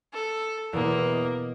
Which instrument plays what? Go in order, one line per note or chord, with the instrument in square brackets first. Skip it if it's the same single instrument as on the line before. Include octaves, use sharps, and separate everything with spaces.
[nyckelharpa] A4
[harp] E2 B2 E4 [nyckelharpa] A#3
[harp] D#5 D6